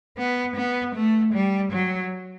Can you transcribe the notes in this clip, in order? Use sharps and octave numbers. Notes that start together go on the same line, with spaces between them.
B3
B3
A3
G3
F#3